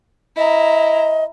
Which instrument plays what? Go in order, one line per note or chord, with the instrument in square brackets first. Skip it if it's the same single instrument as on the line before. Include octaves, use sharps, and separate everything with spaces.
[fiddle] E4 A#5 [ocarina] D#5